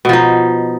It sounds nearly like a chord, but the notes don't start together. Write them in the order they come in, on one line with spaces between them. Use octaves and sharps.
B2 F3 D#4